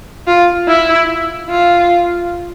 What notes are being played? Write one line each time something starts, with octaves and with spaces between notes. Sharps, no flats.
F4
E4
F4